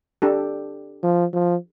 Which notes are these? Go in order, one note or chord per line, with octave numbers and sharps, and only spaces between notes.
D4 G4 A4
F3
F3